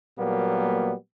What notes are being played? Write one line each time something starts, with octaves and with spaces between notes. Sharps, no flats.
A#2 F#3 G3 A#3 B3